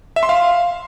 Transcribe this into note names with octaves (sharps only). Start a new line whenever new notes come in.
E5
C6
F5